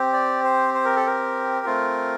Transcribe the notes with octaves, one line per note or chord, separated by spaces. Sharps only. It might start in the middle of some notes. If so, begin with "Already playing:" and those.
Already playing: C4 G4
D5
C5
C5
A#4
A4
A#4
A3 C4 F4